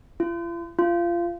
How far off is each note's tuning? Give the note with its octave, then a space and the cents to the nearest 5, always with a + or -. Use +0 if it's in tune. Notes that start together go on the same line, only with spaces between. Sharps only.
F4 -45
F4 -20